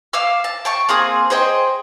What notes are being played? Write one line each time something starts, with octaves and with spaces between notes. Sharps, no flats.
F5 D6 E6 F6
A5
G5 A5 C#6
A#3 C4 G#4 D#6
G#4 C5 D#5 G5